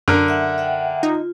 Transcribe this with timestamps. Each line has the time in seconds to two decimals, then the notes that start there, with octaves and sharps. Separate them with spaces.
0.08 F#2 D3 A#4
0.28 E5 F#5
0.58 E5 F#5 G5
1.03 D#4 F4